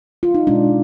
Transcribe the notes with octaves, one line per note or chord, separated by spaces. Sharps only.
F4
D#4
B2 G#3 D4